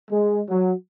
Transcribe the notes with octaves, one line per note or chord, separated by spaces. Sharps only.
G#3
F#3